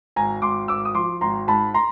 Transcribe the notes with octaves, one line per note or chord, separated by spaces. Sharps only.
G#1 G#5 A#5
G#1 C6 D6
G#1 D6 E6
D#6
F3 C6 D6
G#1 A#5 C6
G#2 A5 B5
A#5 C6